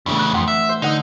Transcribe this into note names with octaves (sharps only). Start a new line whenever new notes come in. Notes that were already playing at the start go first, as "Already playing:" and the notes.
E2 A2 C#3 E3 D4
F#6
F2 F#5 C6
E5
C5
D3 D#4 F#5 D#6